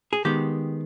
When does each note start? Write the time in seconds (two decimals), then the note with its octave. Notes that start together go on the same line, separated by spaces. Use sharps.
0.13 G#4
0.25 D#3 G#3 B3 G4